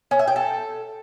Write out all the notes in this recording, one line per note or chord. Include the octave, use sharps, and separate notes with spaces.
C#4
E5
G5
A4